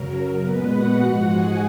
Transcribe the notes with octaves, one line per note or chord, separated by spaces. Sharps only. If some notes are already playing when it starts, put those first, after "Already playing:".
Already playing: F#2 C#3 F#3 A#4
A#4
A#2 G#3 B3 B4
F#4 F#5
G#2 F3 G#3 F#4 F#5
G#4 G#5